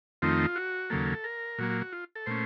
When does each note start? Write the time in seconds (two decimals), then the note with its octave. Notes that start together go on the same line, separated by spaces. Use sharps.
0.22 F2 D#3 A3 C4 D#4 F4
0.56 F#4
0.90 D#2 C#3 F#3 A#3 A4
1.24 A#4
1.58 A#2 F#3 A#3 F#4
1.70 F#4
1.81 F#4
1.93 F4
2.16 A4
2.26 A#2 A3 C#4 C5